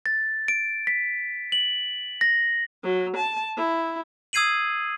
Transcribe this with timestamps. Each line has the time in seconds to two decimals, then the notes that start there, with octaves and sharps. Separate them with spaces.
0.06 A6
0.48 D7
0.87 B6
1.52 F#7
2.21 A#6
2.84 F#3
3.17 A5
3.57 E4
4.33 D#6 E6 G#6 C7 D#7 F#7